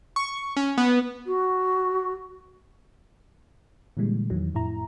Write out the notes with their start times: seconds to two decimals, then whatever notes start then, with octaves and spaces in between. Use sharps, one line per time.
0.16 C#6
0.57 C#4
0.78 B3
1.26 F#4
3.97 A#2 D3 E3 G3 G#3
4.30 E2 D#3 E3 F#3
4.55 F2 A2 E4 A#5